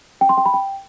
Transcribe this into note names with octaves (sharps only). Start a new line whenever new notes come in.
G5
C6
G5
B5
G5